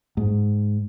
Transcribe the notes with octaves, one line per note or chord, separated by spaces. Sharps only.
G#2